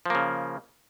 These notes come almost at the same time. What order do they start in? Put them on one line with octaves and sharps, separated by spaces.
F3 A#3 C#3